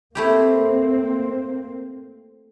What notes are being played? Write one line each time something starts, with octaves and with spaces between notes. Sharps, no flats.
A3 A#3 C4 E4 G4